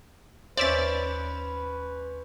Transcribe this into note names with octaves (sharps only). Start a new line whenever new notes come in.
D#2 C#4 B4 C5 D5 E5 A6